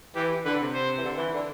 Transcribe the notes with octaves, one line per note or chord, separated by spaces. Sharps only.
E3 G4
D3 B4
C3
C5
E3
D3
E3
D3